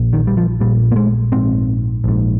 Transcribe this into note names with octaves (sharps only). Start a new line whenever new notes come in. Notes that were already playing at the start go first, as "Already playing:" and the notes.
Already playing: A#1 A#2
D#3
G3
F3
A#1 A#2 G3
A#3
G#3
A#1 G#2 C4
A#1 G#2